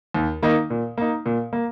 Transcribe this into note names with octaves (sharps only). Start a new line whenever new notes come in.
D#2
D#3 A#3 D#4
A#2
A#3 D#4
A#2
A#3